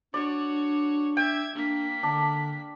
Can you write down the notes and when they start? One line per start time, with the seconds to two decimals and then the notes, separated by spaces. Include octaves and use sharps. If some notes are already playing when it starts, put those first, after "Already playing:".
0.14 D4 F#4 C#5 D5
1.17 E5 G5 G#6
1.55 A#3 D4 B6
2.03 D3 D4